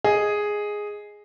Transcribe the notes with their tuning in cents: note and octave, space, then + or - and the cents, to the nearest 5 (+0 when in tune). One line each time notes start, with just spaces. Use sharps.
G#4 +0 D#5 +0